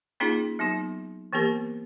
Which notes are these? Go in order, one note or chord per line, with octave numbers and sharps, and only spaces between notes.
A#3 C#4 D#4 F4 G#4
F#3 B3 D#4 F#4
E3 A#3 B3 G4 A#4